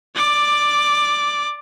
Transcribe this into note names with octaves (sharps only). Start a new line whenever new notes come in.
D5 D6